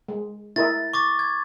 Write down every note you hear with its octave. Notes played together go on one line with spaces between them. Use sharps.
G#3
E4 A#4 D#5 A6
C#6 D6 A6
G#6